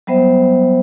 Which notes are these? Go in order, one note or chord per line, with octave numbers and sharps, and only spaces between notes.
F#3 G3 B3 C5 E5